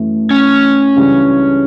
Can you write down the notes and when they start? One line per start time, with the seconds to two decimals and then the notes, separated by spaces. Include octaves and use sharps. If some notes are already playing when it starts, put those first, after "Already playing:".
Already playing: F#2 E3 A3
0.31 C#4
0.96 C#2 C#3 E3 G3 D4